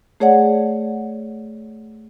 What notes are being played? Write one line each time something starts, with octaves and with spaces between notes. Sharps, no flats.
A3 G#4 C#5 D5 F#5